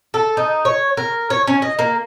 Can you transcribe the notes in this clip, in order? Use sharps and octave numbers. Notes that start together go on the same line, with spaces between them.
A4
D#4
C#5
A#4
C#5
C#4
D#5
A#3